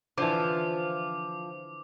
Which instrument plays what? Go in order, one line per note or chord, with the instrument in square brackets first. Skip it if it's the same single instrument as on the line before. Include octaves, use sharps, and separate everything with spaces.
[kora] D3 E3 [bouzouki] F3 [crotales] D6